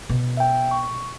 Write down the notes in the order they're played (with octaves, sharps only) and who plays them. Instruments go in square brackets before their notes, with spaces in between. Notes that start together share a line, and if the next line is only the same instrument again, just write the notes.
[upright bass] B2
[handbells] E5 G5
C#6